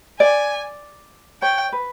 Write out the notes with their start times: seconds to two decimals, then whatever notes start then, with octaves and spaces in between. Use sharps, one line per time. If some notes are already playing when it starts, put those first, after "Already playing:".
0.20 D5 G#5
1.42 C#5 G5
1.72 B4